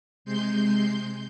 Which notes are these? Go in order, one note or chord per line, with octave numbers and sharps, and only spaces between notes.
C3 G#3 C6 G6